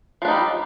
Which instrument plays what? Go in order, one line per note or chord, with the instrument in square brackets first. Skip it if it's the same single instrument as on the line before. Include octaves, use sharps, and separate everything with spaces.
[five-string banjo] F3
D4
D#4
G3